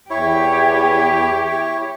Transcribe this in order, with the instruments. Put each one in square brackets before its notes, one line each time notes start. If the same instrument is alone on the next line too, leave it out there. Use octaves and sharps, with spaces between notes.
[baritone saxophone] E2 [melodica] E4 C#5 [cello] G4